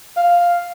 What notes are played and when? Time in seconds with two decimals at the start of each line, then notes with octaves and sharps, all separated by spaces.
0.17 F5